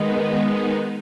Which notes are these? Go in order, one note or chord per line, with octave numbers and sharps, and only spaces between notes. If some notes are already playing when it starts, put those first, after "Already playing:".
Already playing: D#3 G#3 B3 D#4